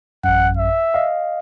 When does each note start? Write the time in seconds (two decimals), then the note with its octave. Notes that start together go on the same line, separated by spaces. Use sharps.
0.24 A1 F#2 F#5
0.57 E5
0.94 D#5 F5